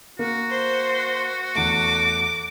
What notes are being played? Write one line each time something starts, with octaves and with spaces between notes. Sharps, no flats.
A#3 F#4
C5
E2 A3 D6